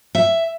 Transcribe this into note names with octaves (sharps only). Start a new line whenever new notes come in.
E5